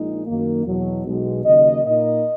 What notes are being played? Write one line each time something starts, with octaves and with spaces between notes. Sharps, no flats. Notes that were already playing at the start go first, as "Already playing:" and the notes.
Already playing: A#1 A#2 G#3 D#4
F#2 D#3 A#3
E2 B2 F#3
B1 B2 G#3
D#2 C#3 F#3 A#3 D#5
A#2 A#3 D#4 D#5